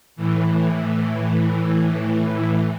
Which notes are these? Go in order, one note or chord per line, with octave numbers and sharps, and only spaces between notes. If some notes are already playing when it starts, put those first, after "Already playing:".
A2 E3